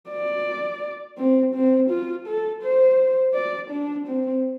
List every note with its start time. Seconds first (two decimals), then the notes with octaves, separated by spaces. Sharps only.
0.10 D5
1.18 C4
1.54 C4
1.90 F4
2.27 A4
2.63 C5
3.34 D5
3.71 D4
4.07 C4